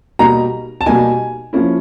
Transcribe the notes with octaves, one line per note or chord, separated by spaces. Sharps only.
B2 G3 A#3 D#4 A#5
A5
B2 G3 A#3 D#4 G#5
F3 A#3 C#4 E4